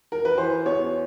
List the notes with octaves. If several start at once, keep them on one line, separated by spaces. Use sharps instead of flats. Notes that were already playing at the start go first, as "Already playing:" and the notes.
A#4
B4
E3 C5
E2 C#5